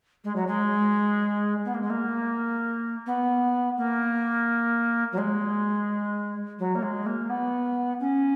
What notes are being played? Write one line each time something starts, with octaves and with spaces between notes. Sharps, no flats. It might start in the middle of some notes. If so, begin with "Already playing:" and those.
G#3
F#3
G#3
B3
A#3
G#3
A#3
B3
A#3
F#3
G#3
F#3
A#3
G#3
A#3
B3
C#4